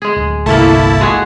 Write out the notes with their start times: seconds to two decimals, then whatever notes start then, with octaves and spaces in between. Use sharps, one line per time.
0.02 G#3 G#4
0.16 D1
0.46 G1 C2 A3 A#3 E4 A5
1.01 G#3 F#4 G#4